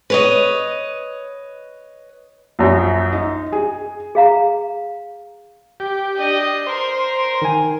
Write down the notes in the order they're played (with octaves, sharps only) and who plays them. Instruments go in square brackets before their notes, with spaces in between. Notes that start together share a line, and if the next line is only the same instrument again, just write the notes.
[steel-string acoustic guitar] B4 C#5 D#5
[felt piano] A#1 F#2
D#4
G#4
[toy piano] G#4 F5 A#5
[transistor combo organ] G4
[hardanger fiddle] D4 D#5
[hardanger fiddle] A#4 [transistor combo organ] C5
[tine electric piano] D#3 G#5